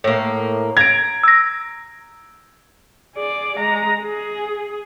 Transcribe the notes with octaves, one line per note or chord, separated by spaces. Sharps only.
A2 A#3
A#5 G#6 D7
E6 A#6
G#4 D5
G#3 A#5
G#4